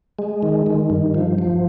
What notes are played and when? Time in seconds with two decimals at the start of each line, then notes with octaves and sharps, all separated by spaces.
0.19 G#3
0.42 D#3
0.66 D#3
0.90 G2
1.14 F3
1.38 F3